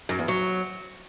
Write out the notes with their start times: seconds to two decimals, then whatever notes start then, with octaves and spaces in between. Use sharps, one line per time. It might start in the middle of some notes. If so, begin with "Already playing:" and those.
0.09 F#2
0.19 E2
0.28 F#3